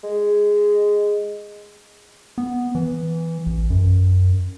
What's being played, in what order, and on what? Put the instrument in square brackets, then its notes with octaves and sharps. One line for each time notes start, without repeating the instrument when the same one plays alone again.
[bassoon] G#3
[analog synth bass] B3
E3
A1
F#2